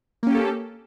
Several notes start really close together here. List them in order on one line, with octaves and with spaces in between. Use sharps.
A#3 C#4 G4 A4